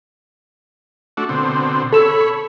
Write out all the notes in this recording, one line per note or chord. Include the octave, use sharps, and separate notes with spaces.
A3 D4 F#4
B2 D3 C4
A4 C#5 B5 E6